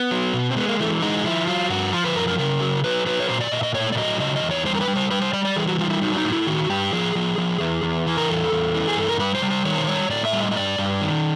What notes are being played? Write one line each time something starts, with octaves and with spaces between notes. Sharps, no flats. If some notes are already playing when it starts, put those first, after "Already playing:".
Already playing: B3
F#3
B2
C4
G#3 B3
A#3
E3 A3
G#3 D#4
F3 E4
F#3 F4
G2 F#4
F3 F4
B4
F#2 A#4
A#4
C#3 A#4
F#3
F#3 B4
F#3 B4
C#5
A#2 C5
D5
A#2 D#5
E5
D#5
A2 C#5
D5
F#3 D#5
C#3 D#5
D#5
E2
C#5
G3 C5
A#4
B4
G3
C5
G3 B4
C5
G3 D5
D5
E3 G#4
F#4
G3 F4
E4
F#3 D#4
D4
D#4
A2
E4
D#3 F#4
G2 G4
F3 G#4
F3
F3
E2
E2
E3
A#4
E2 A4
E2
E3
G#4
G2 A4
A#4
G3 B4
C5
G3
C5
D#3 C#5
C5
G3 C#5
A2 D5
E5
G3
D#5
D#5
G2 D5
G2
D#3